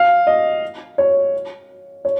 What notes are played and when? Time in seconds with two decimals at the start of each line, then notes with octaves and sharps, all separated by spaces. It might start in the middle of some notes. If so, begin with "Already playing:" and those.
Already playing: F5
0.27 D#5
0.98 C#5
2.05 C#5